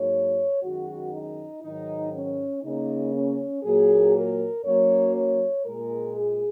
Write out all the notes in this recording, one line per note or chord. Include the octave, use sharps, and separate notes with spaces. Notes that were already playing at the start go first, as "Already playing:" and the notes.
Already playing: G#2 F#3 A#3 C#5
F#2 D#3 G#3 F#4
D#4
G#2 D#3 F#3 D#4
C#4
C#3 A#3 D#4
C#4
A#2 F#3 A#3 G#4
A#4
F#2 F#3 A#3 C#5
C#5
A#2 G#3 A#4
G#4